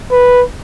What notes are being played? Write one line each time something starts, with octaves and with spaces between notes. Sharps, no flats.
B4